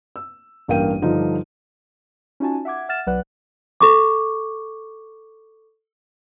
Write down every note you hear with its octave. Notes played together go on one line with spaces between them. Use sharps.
E6
A1 G2 A#3 F5 G5 D#7
G2 D3 F3 D#4 F4
C#4 D#4 F4 F#4 G#5 A5
E5 F#5 D6 G#6
E5 F#5 F6 A6 E7
B1 F#3 B4 D5 F#5 F#6
A4 C#6 D6